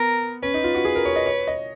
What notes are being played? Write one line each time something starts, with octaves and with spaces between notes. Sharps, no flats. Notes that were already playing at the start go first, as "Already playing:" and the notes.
Already playing: B3 A#4
C#4 B4
D#4
F4
F#4
G#4
A#4
C#5
D#5
C#5
D#5